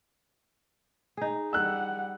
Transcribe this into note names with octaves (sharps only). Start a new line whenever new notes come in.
D#4 G#4
G3 F#5 E6 F#6